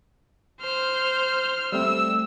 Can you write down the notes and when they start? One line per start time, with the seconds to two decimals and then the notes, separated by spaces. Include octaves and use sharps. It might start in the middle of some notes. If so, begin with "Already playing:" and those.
0.60 C5 F6
1.72 G3 A3 C4 E6